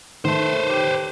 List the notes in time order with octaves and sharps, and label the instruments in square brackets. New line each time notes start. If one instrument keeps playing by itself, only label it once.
[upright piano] D#3 [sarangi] A3 [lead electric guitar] B4 C5
[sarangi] G4